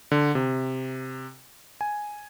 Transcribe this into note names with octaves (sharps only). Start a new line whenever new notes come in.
D3
C3
G#5